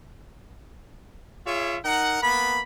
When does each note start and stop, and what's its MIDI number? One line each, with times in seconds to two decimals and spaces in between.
1.45 1.77 65
1.45 1.77 68
1.45 1.77 73
1.45 1.77 76
1.84 2.19 63
1.84 2.19 70
1.84 2.19 78
2.21 2.60 58
2.21 2.60 59
2.21 2.60 83